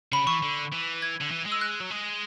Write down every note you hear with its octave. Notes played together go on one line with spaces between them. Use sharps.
C#3 B5
E3 C#6
D3
E3
G#6
D3
E3
G#3
E6
F#6
F#3
G#3